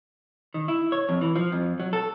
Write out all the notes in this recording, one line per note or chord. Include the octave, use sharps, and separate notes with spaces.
D#3
E4
C#5
F2
E3
F3
F2
F#3
A4